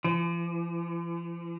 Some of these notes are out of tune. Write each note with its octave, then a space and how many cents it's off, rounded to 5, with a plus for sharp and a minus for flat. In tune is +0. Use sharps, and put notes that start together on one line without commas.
F3 -45